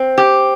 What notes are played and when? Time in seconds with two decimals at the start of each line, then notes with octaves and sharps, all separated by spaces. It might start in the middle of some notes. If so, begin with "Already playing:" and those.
Already playing: C4
0.18 G4